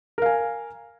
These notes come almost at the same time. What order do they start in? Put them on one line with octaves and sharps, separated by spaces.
A#4 F5 G#5